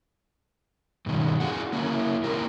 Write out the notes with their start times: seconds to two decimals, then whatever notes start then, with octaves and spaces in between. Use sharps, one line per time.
1.06 G2 B2 D#3 G3
1.40 D4 E4 F#4 G#4 F#5
1.73 A#3 C#4 E4
2.24 A#3 E4 G4 A#4